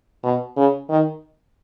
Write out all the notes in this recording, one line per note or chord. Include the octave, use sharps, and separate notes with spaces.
B2
C#3
D#3